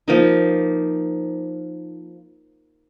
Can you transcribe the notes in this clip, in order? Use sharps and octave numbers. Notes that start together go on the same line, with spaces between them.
F3 A#3 D#4